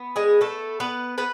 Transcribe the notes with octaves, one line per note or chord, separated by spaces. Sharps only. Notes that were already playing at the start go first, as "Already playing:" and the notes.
Already playing: B3
G#3 G#4
A3 A4
B3 B4
B3 B4